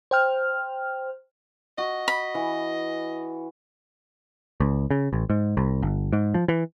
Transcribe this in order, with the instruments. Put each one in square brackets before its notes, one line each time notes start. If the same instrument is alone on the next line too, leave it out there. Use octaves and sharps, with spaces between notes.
[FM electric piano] C5 G5 F6
[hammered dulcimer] F#4 [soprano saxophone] D#5
[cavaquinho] B5
[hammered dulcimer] E3
[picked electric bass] C#2
C#3
A1
G#2
C2
G1
G#2
F3
E3